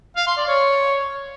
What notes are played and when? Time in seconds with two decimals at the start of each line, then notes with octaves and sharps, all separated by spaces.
0.16 F5
0.27 C6
0.37 D5
0.47 C#5